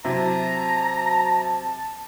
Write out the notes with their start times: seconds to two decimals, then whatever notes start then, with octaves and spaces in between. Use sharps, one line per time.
0.05 C3 F#3 E4 A5 A#5